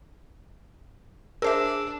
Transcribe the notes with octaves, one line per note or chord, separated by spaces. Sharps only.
D4 G#4 A#4 C5 E5 E6